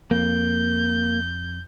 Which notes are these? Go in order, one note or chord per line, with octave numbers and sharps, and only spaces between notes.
F2 A#3 G6